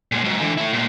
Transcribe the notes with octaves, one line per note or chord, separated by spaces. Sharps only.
A#2 G#3
G#2 F#3
D3 E3
A3 E4
A#2 G#3